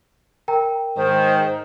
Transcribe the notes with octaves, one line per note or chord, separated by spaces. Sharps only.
A#4 G5 A#5
G#2 D#3 C5